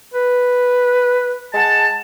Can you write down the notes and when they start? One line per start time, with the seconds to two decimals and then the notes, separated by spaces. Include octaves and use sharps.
0.14 B4
1.54 G#3 F#5 A5